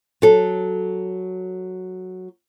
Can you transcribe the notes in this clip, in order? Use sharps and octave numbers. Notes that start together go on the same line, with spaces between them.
F#3 A4